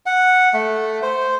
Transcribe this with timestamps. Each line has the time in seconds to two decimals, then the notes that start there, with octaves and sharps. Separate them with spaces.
0.06 F#5
0.54 A3
1.03 C5